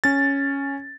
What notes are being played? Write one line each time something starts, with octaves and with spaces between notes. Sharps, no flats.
C#4 A6